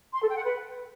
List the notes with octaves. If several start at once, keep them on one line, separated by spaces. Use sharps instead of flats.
C6
A4
G5
F#5
B4